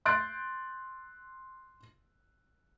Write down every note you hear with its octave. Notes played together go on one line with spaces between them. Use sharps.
C6 F#6 G6 A6 D7